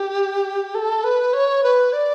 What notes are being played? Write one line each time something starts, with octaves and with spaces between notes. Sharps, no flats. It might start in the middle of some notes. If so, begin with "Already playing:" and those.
Already playing: G4
A4
B4
C#5
B4
D5